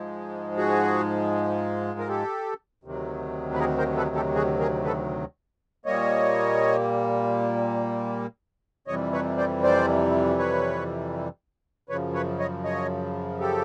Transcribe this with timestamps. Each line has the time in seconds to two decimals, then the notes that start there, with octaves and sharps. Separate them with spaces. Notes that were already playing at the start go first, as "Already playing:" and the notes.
Already playing: G#2 F3 G#3
0.57 F#4 G#4
1.99 A#4
2.08 G4 A4
2.84 D2 C3 D#3 F#3
3.54 B4
3.59 G#4 A#4
3.78 A#4 C5
3.97 A4 B4
4.15 G4 A4
4.35 F#4 G#4
4.60 G#4 A#4
4.84 A4 B4
5.85 A#2 G3 A#3 C#5 D#5
8.87 F2 C3 E3 G3 C#5 D#5
9.13 B4 C#5
9.38 C5 D5
9.63 C5 D5
10.38 B4 C#5
11.89 F#2 C#3 F3 B4 C#5
12.14 B4 C#5
12.39 C#5 D#5
12.64 C#5 D#5
13.40 G4 A4